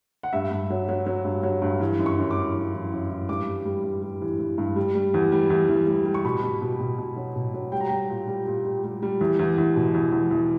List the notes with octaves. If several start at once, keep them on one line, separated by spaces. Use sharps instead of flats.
F#5
G2 E5
G2
F#3
F#3
F#3
G2
F#3
G2
E3
F#2
C#6
F#2
D6
E3
F#2
E3
F#2
E3
G2 D6
G3
G3
G2
G3
E3
E3
G2
G3
G3
E2
G3
E2
E2
G3
G3
C#6
B2 B5
B2
B2
B2
B2
F#3
B2
F#3
G3 G5
A#5
G3 G5
A#2
G3
A#2
G3
G3
G3
E2
E2
E2
B2
E2
E2
E2